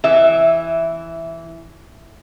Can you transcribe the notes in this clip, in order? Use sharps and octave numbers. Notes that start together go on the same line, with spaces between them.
E3 E5